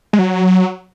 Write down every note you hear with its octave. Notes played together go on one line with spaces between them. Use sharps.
G#3
F#3